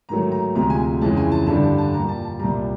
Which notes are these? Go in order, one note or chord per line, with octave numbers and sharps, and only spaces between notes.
G#2 D#3 F#3 A3 A#5
A#5
D2 C3 F3 G#3 A#5
G#5
F2 C#3 E3 G#3 A5
G#5
A5
G2 D3 G3 A5
A5
A#2 G3 A#5
A5
A5
C2 A#2 G3 A#5